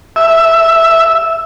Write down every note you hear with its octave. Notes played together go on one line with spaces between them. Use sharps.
E5